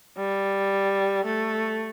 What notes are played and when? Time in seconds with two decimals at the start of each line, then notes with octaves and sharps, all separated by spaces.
0.18 G3
1.25 A3